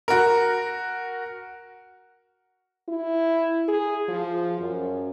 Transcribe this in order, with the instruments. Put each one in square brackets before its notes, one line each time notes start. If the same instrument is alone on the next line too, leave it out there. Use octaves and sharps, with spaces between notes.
[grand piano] F#4 A#4
[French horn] E4
G#4
F3
F#2